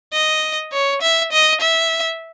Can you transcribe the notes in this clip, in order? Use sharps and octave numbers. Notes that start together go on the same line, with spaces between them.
D#5
C#5
E5
D#5
E5